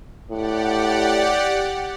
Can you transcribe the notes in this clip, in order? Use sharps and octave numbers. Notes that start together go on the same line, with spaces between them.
A2 G4 D5 F#5